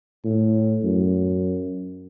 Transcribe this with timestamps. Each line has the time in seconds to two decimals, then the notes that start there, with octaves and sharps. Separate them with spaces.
0.24 A2
0.83 F#2